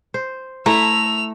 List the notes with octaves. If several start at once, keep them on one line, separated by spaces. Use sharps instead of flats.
C5
A3 E4 A#5 E6 F7